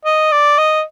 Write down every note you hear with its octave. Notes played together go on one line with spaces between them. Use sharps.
D#5
D5
D#5